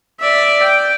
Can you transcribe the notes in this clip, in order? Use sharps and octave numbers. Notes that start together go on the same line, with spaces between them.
D5 E5
G5